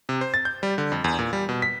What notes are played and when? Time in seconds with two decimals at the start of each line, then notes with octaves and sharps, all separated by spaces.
0.09 C3
0.21 C5
0.34 A6
0.45 G6
0.63 G3
0.78 D3
0.92 F2
1.04 E2
1.19 A#2
1.33 G3
1.49 B2
1.62 B6